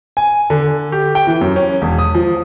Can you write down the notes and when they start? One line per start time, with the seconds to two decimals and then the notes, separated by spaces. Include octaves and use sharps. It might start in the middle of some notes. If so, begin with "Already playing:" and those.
0.17 G#5
0.50 D3
0.92 G4
1.15 G5
1.27 E3
1.41 F#2
1.56 C#4
1.82 E1
1.99 D#6
2.15 F3